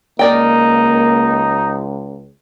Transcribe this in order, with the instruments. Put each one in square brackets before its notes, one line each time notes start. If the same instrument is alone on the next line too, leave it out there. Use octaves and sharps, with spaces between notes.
[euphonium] C#2 [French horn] A#3 [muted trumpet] D#4 [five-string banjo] A#4 D5 G5